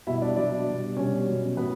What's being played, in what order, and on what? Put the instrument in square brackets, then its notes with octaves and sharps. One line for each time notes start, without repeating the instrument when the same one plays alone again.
[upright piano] B2 G3 E4 E5
D4 D5
B2 F#3 D4 D5
B2 G3
B2 G3 C#4 C#5
B2 F#3
A2 F#3 B3 B4